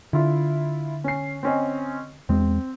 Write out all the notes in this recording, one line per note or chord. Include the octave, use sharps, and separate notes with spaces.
D3 E4 F4
C#4 C7
C4 C#4 D#5
E2 G#3 C4